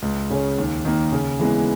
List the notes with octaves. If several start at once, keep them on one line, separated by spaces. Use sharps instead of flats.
C#2
C#3 G#3 C#4
D#2
D#3 A#3
C#3
E3 G#3 B3